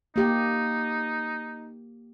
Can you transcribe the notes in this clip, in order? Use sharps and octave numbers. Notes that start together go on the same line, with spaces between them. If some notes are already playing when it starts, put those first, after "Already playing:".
A#3 D#4 G4